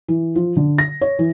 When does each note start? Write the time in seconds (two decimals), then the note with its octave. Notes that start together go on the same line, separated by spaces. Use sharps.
0.08 E3
0.36 F3
0.57 D3
0.78 A#6
1.01 C#5
1.19 E3